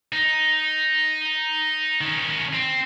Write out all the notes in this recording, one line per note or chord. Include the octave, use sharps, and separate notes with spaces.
D#4
D#3 C#4
C4